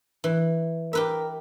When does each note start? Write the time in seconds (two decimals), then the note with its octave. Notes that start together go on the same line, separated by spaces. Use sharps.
0.24 E3
0.93 G4 A#4 B4 E5